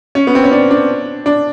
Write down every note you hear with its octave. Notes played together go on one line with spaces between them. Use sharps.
C#4
B3
C4
C#4
D4
D4
D4